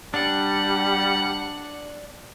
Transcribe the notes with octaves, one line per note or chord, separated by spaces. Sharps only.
G3 D4 F#5